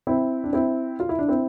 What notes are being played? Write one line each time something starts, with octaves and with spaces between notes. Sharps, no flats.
C4 E4
D4
C4 E4
F4
E4
D4
C4 E4